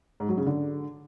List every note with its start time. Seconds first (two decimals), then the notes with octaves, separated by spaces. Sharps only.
0.20 G#2
0.29 F#3
0.38 C#3
0.46 D3